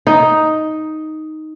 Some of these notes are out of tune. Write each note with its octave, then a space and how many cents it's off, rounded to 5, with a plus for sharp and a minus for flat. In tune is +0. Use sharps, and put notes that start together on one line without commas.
D#4 +5